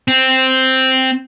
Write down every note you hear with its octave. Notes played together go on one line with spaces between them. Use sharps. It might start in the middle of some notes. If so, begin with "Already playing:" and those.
C4